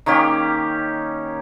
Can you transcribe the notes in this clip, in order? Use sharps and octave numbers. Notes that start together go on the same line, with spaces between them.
D#3 A#3 C#4 G4